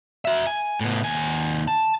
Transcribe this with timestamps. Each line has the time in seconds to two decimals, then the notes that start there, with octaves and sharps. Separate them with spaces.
0.25 F#4 E5
0.47 G#5
0.80 A2 B3
1.04 D#2 G#5
1.68 A5